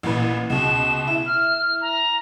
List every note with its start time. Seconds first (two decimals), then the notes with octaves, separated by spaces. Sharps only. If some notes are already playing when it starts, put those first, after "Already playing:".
0.03 A1 A#2 B4
0.50 C#2 B2 E7
1.07 E4
1.26 F6
1.81 A#5